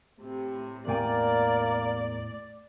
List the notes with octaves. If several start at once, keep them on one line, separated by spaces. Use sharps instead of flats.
A2 C3
E2 A2 A#3 D5 G5 G#5